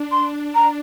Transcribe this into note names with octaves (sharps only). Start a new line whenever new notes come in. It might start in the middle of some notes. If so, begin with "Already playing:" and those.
Already playing: D4
C6
A#5